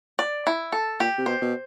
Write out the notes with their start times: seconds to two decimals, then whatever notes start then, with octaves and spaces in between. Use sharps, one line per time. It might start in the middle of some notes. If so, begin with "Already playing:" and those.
0.19 D5
0.47 E4
0.72 A4
1.00 A#2 G4
1.18 C3
1.26 B2 C5
1.42 B2